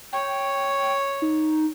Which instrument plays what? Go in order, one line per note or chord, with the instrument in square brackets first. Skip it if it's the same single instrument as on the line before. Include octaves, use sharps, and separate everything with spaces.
[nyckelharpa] C#5 [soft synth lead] G5
[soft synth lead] D#4